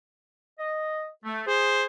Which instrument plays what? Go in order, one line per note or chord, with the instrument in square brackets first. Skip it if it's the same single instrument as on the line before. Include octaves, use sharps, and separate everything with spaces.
[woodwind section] D#5
A3
[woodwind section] G#4 [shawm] C5